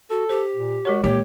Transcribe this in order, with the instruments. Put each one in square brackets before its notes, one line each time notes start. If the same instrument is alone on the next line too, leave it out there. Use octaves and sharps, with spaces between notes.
[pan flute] F#4 [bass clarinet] A4
[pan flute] G4 [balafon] C5
[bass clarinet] A#2
[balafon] G#3 A#4 C#5 [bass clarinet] F#4
[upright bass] A#2 E3 [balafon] G#3 [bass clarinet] G4 [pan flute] C#5